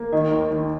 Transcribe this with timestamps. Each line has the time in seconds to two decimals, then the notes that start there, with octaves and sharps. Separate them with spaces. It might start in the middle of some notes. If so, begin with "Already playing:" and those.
Already playing: A#3
0.13 D#3 D#5
0.32 D#2
0.51 D#3